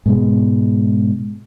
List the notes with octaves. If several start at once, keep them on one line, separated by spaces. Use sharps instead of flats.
G#2 B2 G#3